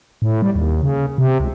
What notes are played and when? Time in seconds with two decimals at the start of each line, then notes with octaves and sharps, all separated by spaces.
0.22 A2
0.42 G3
0.55 D#2
0.83 C#3
1.18 C3
1.40 C#2